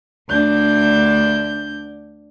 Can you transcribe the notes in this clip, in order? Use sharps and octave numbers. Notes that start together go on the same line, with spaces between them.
D2 D4 G6